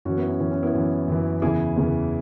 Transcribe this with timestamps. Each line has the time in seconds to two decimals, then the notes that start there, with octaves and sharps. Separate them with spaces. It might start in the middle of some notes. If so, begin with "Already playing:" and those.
0.05 F#2 E3 C#4 F#4
0.16 B3 E4
0.28 C#4
0.40 F#2 E3 C#4
0.51 C#4
0.63 B3 E4
0.74 F#2 E3
1.08 F#2 E3
1.42 E2 C#3 E3 E4 G#4
1.76 E2 C#3 E3